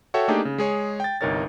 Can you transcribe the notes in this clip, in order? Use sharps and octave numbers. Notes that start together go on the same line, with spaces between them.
F#4 A4 C#5 E5 G5
A3 A#3 D4 D#4 G4 G#4
C#3
G#3 G#4 C#5
G5 A6
G1 C2 D#4 A#4 C#5 A6